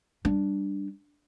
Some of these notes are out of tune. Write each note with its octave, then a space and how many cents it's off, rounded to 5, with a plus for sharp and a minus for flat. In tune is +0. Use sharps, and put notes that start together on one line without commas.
G3 +0 D4 +0